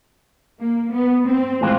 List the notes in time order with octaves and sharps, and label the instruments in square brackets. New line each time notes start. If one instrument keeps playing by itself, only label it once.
[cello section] A#3
B3
C4
[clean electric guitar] A2 E3 G#3 C4 F4